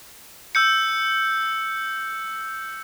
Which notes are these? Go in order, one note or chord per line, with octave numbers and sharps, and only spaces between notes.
E6 G6 C#7